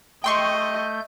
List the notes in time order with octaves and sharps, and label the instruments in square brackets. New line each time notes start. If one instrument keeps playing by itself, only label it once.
[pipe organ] A3 G6 [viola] D#5 [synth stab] G5 C6 C#6